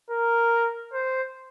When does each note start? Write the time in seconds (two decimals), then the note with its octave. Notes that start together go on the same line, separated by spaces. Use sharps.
0.11 A#4
0.93 C5